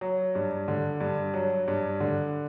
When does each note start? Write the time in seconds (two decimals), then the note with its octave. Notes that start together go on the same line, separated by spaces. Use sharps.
0.01 F#3
0.35 G2
0.68 D3
1.00 G2
1.34 F#3
1.68 G2
2.00 D3